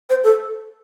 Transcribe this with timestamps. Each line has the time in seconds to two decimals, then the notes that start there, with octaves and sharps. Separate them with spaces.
0.10 C5
0.24 A4